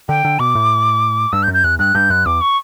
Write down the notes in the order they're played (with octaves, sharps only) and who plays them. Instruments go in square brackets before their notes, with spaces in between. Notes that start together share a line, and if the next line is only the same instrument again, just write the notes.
[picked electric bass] D3 [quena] G5
[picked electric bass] D3
[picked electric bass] B2 [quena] D6
[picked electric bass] A2
[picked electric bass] G2 [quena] E6
[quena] G6
[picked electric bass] F#2
[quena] G6
[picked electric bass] E2 [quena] F#6
[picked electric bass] G2 [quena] F#6
[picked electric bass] G2 [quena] G6
[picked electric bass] F#2 [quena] F#6
[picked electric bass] E2 [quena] D6
[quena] C#6